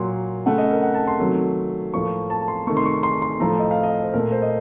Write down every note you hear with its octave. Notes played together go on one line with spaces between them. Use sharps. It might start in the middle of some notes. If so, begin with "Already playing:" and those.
Already playing: A#2 F#3 A#3 C6
C#3 A3 F#5
D#5
A#4
F#5
A5
C6
C3 D#3 F#3 A3
A2 F3 A#3 C#6
A5
C6
C3 D#3 A3 C#6
C6
C#6
C6
C6
A2 F3 A3 A#5
D#5
F5
D#5
C5
A#2 A3 A#4
C5
D#5